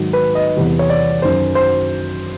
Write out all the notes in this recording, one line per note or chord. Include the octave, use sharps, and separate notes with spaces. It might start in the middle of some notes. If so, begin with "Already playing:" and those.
Already playing: G#2 D#3 F#3
B4
D#5
E2 C3 E3 G3
C#5
D5
F#2 D#3 F#3 C5
C5